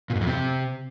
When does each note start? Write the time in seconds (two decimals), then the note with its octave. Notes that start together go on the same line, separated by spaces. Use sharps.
0.10 A#2
0.15 G#2
0.21 F2
0.27 C3